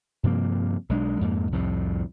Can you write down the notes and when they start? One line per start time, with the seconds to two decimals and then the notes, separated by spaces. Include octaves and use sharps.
0.23 G2 C3 F3 A#3
0.89 B1 G#3 D4
1.21 F2 G#2 G3 A#3
1.52 C2 F2 A2 C3